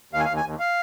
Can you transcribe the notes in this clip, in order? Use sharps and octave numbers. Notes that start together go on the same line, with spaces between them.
D#2 F5
G#5
F5
D#2
G#5
D#2
F5